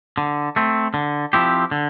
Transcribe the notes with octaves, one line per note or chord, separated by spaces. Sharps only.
D3
A3 C4
D3
F3 C4 E4 G4
D3